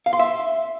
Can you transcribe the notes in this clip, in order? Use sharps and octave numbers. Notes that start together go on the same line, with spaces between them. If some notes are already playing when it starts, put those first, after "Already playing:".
F5
C6
E5